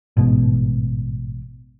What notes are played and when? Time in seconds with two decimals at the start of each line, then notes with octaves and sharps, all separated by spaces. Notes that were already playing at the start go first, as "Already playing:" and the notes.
0.17 A1 G#2 B2